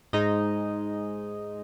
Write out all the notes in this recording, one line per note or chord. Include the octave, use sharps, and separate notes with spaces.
G#2 G#3 D#4 D#5